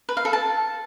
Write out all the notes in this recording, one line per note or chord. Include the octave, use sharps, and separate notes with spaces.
B4
F5
A4
A5